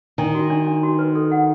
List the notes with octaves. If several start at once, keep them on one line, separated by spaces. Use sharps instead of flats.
D#3 D4
F#4
D4
D4
F#4
B4
A4
F#5